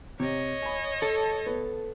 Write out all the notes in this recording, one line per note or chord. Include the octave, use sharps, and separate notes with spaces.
C3 C#5 D#5
G#5 B5
A4
B3